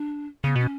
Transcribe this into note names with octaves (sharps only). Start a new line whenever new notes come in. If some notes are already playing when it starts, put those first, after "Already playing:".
Already playing: D4
C#3 B3
B2 C#4